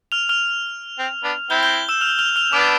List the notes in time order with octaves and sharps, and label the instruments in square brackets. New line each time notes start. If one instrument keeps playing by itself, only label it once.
[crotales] F6 F7
F6 F7
[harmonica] C4
B3 D4
[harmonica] C4 E4 [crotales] G6 G7
[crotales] G6 G7
E6 E7
F6 F7
F6 F7
F6 F7
[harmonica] B3 D4 [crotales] D6 D7